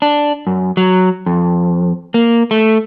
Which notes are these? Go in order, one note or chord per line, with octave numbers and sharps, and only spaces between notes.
D4
F#2
F#3
F2
A#3
A3